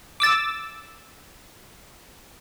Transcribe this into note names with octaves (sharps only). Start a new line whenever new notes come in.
D6 E6 A6